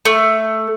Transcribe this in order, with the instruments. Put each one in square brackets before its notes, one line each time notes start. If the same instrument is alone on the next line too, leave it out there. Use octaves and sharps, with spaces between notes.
[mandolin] A3